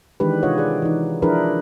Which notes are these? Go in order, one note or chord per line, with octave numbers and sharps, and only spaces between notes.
D#3 E3 G#3 D4 G4 B4
C3 D4 F4 C#5 D#5 F#5
G#4 D5
E3 D#4
F3 D4 E4 G#4 A#4 B4